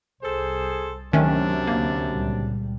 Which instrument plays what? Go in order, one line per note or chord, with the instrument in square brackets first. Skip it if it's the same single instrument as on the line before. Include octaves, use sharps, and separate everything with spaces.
[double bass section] C2 [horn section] G#4 A4 C5
[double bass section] C#2 F#3 [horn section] F#2 C3 D4 [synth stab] D#3 A3 C#4
[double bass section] D2 [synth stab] A#3
[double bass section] C#2 A#2 G3